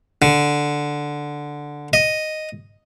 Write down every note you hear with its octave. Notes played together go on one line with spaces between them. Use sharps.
D3
D#5